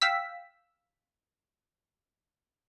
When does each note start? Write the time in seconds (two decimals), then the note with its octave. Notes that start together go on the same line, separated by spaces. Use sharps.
0.01 F5 G5 E6 B6